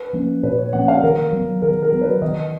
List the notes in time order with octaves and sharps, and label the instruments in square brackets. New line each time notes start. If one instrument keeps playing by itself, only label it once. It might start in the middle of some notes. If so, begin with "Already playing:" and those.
Already playing: [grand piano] B4
[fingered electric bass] F3 A#3 C#4
[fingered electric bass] A#2 [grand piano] B4
[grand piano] C#5
[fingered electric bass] F3 A#3 C#4 [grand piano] F#5
[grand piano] F5
[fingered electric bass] D#3 [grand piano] A#4
[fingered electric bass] F#3 B3
[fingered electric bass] D#3 [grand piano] A#4
[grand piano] A#4
[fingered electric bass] F#3 B3
[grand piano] B4
[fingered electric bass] D#3 [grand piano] D#5